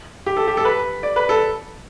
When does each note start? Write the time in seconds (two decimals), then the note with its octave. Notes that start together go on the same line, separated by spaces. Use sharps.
0.26 G4
0.37 A4
0.48 G4
0.57 A4
0.65 B4
1.03 D5
1.16 B4
1.29 A4